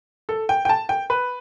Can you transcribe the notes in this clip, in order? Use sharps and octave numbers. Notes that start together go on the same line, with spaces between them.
A4
G5
G5
A5
G5
B4